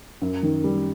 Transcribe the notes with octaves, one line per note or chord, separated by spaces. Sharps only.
F#2
D#3
G3